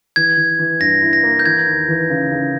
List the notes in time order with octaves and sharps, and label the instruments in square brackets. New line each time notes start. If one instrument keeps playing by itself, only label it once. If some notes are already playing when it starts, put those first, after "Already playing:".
[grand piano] E3 [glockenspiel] G#6
[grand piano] E3
E3
[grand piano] G2 [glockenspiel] A#6
[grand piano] E4
[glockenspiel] A#6
[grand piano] A#3
[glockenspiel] G6
[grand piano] E3 [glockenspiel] G#6
[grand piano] D#2
E3
C#3
C#3